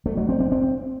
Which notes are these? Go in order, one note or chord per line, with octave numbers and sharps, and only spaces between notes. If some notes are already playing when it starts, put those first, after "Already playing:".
A3
F#3
C4
C4
C4